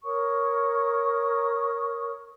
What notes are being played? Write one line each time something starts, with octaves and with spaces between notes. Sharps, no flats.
A#4 C#5 C#6 D#6